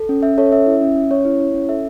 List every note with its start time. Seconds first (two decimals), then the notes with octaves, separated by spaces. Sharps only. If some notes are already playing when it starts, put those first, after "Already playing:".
Already playing: A4
0.09 C#4
0.23 C#4 E5
0.38 A4 C#5
0.52 C#4 E5
0.66 E4
0.81 C#4
0.96 C#4
1.11 C#4 C#5
1.25 E4
1.40 E4
1.54 C#4
1.69 A4 E5